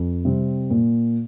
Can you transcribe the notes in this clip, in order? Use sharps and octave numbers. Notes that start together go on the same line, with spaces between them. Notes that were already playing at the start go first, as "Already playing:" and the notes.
Already playing: F2
C3 G3 C4
A#2